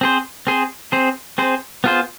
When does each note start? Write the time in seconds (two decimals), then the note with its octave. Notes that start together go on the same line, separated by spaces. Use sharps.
0.01 C4 G#4 C5
0.47 C4 G#4 C5
0.92 C4 G#4 C5
1.38 C4 G#4 C5
1.84 B3 F4 G#4 C5